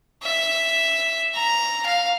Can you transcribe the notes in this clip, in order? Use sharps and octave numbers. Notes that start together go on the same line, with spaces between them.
E5
A#5
F5